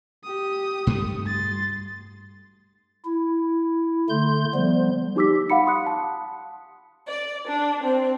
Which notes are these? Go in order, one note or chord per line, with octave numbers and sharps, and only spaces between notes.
G4 D#6
G2 A3
C6 A6
E4
D3 A3 C6 G6
F3 G3 B3
D#4 G4 D6 E6 B6
F5 F#5 B5 C#7
C6 D#6 F#6
A5
D5
D4
C4